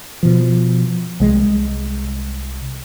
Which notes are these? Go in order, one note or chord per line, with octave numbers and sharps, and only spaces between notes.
B2 F3
C2 G#3